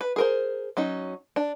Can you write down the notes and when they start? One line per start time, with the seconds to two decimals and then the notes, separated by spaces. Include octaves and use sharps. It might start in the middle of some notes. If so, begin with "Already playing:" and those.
0.01 B4
0.16 G#4 A#4 C5
0.77 F#3 C#4 D#4
1.36 D4